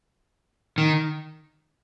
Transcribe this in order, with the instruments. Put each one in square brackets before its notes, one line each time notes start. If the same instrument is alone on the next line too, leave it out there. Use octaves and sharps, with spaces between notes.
[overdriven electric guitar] D#3